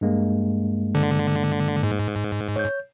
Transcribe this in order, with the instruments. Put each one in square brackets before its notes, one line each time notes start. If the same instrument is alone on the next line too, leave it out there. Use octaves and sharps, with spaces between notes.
[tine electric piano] G2 G#3 A#3
[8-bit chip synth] D3
G#2
[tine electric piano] C#5 G6